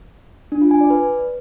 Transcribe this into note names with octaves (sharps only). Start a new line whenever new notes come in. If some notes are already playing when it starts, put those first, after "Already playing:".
D4
F4
G#5
D5
B4